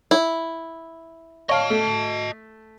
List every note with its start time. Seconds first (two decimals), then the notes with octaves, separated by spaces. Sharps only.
0.11 E4
1.49 C#5 D#5 F5 A5
1.70 A3